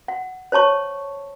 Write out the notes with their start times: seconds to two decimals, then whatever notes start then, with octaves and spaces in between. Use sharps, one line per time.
0.08 F#5
0.52 C5 C#5 A5 C#6